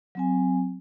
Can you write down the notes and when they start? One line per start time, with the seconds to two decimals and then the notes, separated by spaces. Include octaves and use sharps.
0.15 F#3 C4 G#5